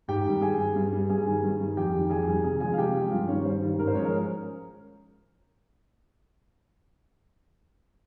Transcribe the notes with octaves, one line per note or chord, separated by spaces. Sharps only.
G#2 G4 G5
D#3 G3
G2 G#4 G#5
G3
G2
G3
G2 G#4 G#5
D#3 G3
G2
D#3 G3
F2 G4 G5
D#3 G3
F2 G#4 G#5
D#3 G3
C3 G#4 G#5
F3 G#3 G#4 G#5
F5
C3 G4 G5
F3 G#3
G2 F4 F5
D#3 G3 C#4 C#5
G2 C5
D#3 G3
G#2 A#4
C5
F3 G#3 C#4 C#5
A#4